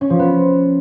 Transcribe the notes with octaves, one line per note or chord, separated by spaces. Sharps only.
C#4
F3
B3